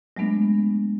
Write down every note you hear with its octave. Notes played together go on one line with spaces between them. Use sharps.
F#3 G#3 A3 B3 D4